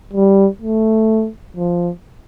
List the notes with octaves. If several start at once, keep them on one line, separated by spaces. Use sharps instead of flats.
G3
A3
F3